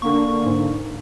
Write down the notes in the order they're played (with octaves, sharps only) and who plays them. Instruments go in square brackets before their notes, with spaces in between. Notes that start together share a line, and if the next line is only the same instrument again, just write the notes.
[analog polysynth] D3 A#3 [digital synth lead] C#6
[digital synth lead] G#2